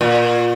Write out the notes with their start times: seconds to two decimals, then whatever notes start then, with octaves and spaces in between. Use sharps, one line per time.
0.01 A#2